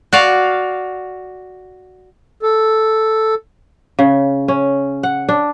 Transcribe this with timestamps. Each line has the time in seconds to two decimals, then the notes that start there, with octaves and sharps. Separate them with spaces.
0.13 F#4 D5 F5
2.43 A4
3.99 C#3
4.48 C#4
5.03 F#5
5.29 D4